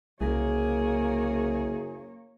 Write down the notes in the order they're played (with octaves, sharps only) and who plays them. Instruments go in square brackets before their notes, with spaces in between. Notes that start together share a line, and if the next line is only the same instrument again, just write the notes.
[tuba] F#1 [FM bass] C2 [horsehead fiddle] A#3 C#5 [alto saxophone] G#4